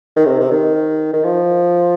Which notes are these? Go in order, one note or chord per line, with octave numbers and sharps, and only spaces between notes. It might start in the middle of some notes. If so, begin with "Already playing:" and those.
D#3
C3
C3
D#3
D#3
F3